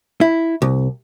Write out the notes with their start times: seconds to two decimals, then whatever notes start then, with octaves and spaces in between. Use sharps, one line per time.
0.21 E4
0.62 C2